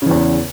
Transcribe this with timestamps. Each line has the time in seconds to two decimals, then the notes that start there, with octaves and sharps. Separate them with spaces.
0.02 C#3
0.06 E3
0.11 E2